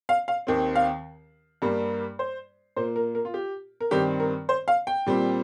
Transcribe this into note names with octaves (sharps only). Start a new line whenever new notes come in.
F5
F5
D#2 D#3 C4
F5
G2 G3 A#3
C5
A#2 A#3 C5
A#4
A#4
F4
G4
A#4
G2 D#3 C4 G4
A#4
C5
F5
G5
A#2 G3 C4